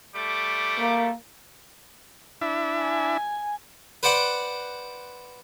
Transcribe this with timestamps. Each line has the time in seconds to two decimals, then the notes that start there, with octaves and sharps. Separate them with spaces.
0.14 G3 A3 D6
0.78 A#3
2.41 D4 E4 E5
2.81 G#5
4.03 B4 C5 D5 F#5 G5